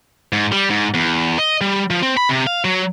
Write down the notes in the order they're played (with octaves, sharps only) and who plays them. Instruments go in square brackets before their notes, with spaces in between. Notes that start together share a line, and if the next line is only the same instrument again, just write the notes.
[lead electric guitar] G#2
G3
G#2
E2
D#5
G3
F3
C4
B5
C3
F5
F#3